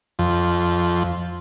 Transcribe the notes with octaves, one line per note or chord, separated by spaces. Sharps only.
F2